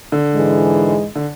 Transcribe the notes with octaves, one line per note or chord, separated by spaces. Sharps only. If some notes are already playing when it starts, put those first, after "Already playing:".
D3
G#2 E3 G#3
D3